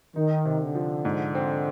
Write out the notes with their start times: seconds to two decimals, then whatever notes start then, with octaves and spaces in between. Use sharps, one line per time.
0.16 D#3 D#4
0.45 C3
0.60 D3
0.75 F3
1.05 G#2
1.35 C4